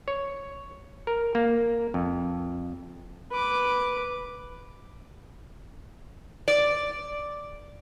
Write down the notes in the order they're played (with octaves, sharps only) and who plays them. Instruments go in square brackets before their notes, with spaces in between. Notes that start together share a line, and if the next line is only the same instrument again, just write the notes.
[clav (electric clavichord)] C#5
A#4
A#3
F2
[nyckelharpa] B4 D6
[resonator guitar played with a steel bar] D5